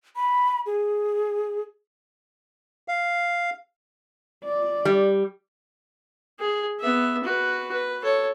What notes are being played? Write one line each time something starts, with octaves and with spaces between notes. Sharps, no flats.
B5
G#4
F5
D5
G3
G#4
B3 E5
F#4 B4
B4
A4 C#5